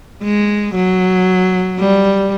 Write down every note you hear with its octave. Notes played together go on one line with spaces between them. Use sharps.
G#3
F#3
G3